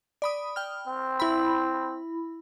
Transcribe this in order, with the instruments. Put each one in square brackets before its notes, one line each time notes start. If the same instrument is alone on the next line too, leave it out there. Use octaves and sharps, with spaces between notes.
[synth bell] D5 B5 D#6
G5 F6
[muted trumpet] C4
[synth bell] E4 B5